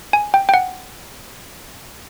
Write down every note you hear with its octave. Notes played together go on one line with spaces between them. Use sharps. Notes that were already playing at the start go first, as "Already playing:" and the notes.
G#5
G5
G5
F#5